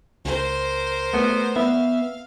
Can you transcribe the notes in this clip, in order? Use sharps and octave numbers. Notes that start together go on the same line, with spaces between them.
C#2 A#4 C5
A3 B3
B3 E5 F5